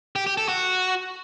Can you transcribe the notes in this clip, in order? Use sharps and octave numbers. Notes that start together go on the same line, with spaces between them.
G4
G4
A4
F#4